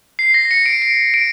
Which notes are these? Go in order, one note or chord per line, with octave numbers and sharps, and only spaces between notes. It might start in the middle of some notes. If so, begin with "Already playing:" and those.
C7
A#6
C#7
D7
D7
D7